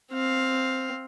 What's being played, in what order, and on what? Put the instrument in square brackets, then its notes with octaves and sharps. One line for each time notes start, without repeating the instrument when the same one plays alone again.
[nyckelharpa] C4 F5